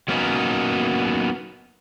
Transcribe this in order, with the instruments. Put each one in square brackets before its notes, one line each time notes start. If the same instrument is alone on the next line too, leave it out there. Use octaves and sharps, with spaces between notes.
[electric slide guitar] F#3 A#3 B3 C#4 D#4